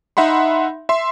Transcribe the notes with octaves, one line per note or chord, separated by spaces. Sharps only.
D#4 E5 F#5 B5 C6
E5 C6